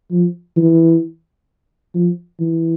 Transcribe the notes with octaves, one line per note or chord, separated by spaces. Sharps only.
F3
E3
F3
E3